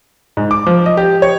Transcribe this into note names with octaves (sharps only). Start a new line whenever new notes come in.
G#2
D6
F3
D#5
G4
C#5